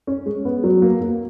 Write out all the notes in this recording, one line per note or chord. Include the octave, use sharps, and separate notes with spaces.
C#4
G#3
B3
F#3
A#3
A#3